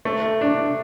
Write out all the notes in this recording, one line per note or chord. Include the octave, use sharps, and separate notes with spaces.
A3
D4